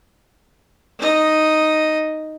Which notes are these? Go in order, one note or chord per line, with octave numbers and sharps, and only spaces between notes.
D#4 D#5